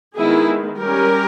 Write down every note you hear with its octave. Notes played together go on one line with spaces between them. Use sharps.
D#3 G#3 B3 E4 G#4
G3 C#4 G4 A#4